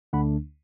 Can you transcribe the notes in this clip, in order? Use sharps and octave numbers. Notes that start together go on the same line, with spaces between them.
D2 D3 A3 D4 F#5 B5